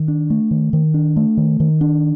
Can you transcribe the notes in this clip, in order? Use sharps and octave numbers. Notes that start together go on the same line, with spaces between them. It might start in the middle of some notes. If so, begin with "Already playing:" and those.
Already playing: D#3
D4
A3
D#3
D#3
D4
A3
D#3
D#3
D4